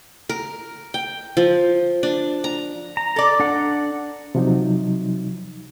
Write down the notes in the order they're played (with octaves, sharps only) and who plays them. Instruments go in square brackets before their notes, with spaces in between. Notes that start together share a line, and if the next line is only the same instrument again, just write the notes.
[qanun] A#4
G5
F3
D4
A#5
[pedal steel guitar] A#5
[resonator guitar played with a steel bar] A4 D5
[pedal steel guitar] D4 F#5
[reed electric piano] C3 F3 F#3 D#4